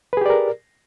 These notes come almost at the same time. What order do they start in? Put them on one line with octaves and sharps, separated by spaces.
B4 G#4 G4 D5 A#4